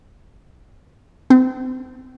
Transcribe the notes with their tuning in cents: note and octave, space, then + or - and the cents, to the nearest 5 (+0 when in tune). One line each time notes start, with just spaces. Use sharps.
C4 -30